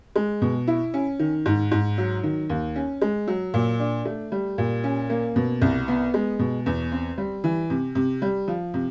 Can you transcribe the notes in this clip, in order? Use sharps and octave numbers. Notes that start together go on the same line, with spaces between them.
G#3
B2
E4
C#4
D#3
G#2
G#2
F#3
D#3
D#2
C#4
G#3
F#3
A#2
D4
A3
G3
A#2
C#4
A#3
B2
C2
B3
G#3
B2
E2
C4
G3
E3
C3
C3
G3
F3
C3